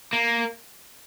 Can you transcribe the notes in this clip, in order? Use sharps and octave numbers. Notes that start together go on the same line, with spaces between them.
A#3